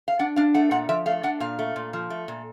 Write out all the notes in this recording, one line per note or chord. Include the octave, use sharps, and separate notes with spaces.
F5
D4 F#5
D4 F5
A3 F#5
A#2 F#5
F3 E5
A3 F5
D4 F#5
A#2 F5
A3
A#2
F3
A3
A#2